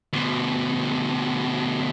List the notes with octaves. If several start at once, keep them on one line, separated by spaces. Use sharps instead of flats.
D2 B2